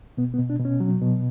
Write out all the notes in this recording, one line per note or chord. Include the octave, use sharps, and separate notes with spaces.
B2 B3
B3
B2
D4
B2
C#4
F#3
B2